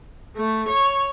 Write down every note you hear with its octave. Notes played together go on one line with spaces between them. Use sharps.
A3
C#5